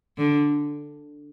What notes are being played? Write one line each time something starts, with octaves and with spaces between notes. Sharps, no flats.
D3